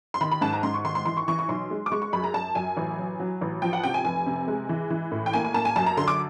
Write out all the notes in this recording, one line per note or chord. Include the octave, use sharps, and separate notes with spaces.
C6
D#3 B5
B5
G#2 A5
A#5
G#2 C6
C#6
D#3 C6
C6
E3 C6
C#6
E3 C#6
C#6
B1 C6
G#3
D6
G#3 C#6
C#6
F#2 B5
A#5
F#2 A5
F#2 G#5
A1
F#3
F#3
A1
F3 G5
F#5
C3 G5
G#5
F1 G#5
C3
G#3
E3
E3
A2
G5
A#3 G#5
G#5
A#3 A5
G#5
F#2 A5
A#5
D3 C6
D6